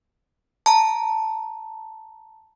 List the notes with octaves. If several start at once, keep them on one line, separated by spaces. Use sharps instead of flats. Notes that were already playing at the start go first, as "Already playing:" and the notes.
A5 A#5